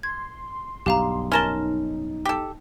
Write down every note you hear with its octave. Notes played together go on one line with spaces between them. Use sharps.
C6 G#6
B1 G2 G4 F5 A#5
C#4 D#4 A#4 A5 C6 E7 G7
G4 A4